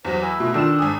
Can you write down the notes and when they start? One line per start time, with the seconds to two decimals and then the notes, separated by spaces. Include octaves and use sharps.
0.05 E2 F#3 C5
0.21 E4 G#5
0.40 B2 A3 F4
0.54 D#3 D4 F4 A4 E7
0.79 G#1 G#5 D#6